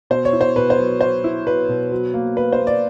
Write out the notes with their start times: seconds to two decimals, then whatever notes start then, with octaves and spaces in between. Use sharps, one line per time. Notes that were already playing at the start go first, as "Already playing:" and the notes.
0.10 B2 C5
0.25 C#5
0.33 E4
0.41 C5
0.56 B2 B4
0.70 C5
0.78 F#3
1.01 F#3 C5
1.24 E4
1.46 F#3 B4
1.69 B2
1.92 F#3
2.14 A#3
2.36 A#3 B4
2.52 C5
2.59 A#3
2.67 D5